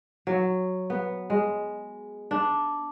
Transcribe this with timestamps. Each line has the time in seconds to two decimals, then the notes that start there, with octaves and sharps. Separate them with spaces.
0.27 F#3
0.90 B3
1.30 G#3
2.31 D4